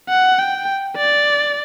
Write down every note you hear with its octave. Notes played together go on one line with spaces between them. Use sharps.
F#5
G5
D5